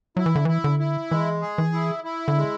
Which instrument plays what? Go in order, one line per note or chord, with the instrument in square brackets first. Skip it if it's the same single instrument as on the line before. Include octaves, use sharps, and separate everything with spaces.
[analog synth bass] F#3 [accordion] E4
[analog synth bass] E3
D3
[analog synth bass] E3 [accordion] E4
[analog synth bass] D3
[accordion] E4
[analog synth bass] E3 [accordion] G#3
[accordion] G#4
[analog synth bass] E3
[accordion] E4
E4
[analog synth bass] D3
[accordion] G#3